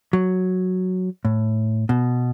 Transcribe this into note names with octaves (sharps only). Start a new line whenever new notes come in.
F#3
A2
B2